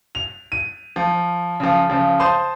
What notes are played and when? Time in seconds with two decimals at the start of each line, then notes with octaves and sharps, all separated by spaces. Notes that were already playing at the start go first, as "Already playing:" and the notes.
0.15 F7
0.52 D#7
0.96 F3
1.60 C#3 F3
1.90 C#3 F3
2.19 C5 A5 C6 D#6